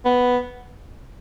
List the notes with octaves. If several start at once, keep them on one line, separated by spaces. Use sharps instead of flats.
B3